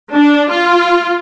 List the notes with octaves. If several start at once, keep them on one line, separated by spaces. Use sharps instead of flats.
D4
F4